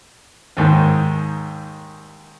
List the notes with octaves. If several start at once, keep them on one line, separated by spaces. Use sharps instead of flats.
D#2 G#2 D#3